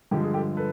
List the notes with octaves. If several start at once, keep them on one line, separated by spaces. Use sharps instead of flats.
G2 D3 F3 G#3 G4
G#4
G4 A4
A4 B4